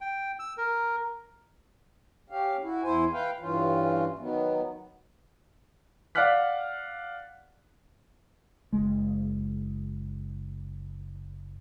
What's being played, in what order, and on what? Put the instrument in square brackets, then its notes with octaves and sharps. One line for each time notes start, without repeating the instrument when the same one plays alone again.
[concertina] G5
E6
A#4
[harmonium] C#4 G4 F5
E4 F#4
E2 E4 C5 G#5
B4 F5 G5
G2 E3 C#4 F4
D#3 F#3 B3
[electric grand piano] D5 F5 F#5 F6 F#6 B6
[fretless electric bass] F#1 G#3